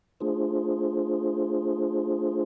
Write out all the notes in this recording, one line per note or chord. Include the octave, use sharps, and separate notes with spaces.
A3 D4 F4 G#4 C5